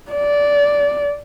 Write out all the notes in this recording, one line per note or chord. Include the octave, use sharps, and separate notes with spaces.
D5